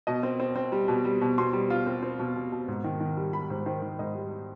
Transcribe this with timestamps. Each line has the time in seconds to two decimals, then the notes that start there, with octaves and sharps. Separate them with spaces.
0.07 B2 D#5
0.23 C4
0.40 C4
0.56 C4
0.72 G3
0.88 B2
1.04 G3
1.21 B2
1.38 B2 C6
1.53 G3
1.70 F4
1.86 C4
2.03 C4
2.19 B2
2.36 B2
2.52 B2
2.68 G#2
2.84 D#3
3.00 D#3
3.17 G3
3.33 G3 B5
3.50 G#2 C5
3.66 D#3 C5
3.82 D#3
3.99 G#2 D#5
4.15 G3